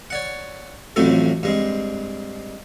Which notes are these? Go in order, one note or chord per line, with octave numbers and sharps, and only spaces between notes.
C#5 D5 F#5
A1 F2 A2 F#3 C4 A4
G2 G#3 C4